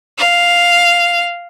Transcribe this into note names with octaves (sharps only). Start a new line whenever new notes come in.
F5